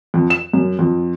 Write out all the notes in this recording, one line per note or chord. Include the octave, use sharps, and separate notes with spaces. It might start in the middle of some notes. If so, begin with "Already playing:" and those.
F2
E7
F#2
F2